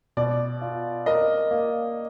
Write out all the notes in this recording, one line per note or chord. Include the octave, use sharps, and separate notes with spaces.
B2 D5
F4
A#4 D#5
A#3